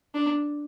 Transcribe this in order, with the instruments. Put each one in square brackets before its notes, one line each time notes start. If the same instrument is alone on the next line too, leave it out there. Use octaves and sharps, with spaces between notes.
[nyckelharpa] D4